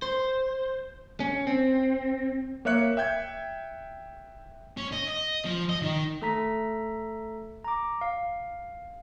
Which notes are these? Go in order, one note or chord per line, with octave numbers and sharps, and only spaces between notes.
C5
C#4
C4
A#3 C#5 E5 F#6 C#7
E5 G5 G6 G#6
C#4
D#5
D#5
F3
D#5
D#3
A3 A4 A#5 B6
A#5 D6
F5